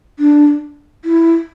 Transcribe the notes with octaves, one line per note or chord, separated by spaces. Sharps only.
D4
E4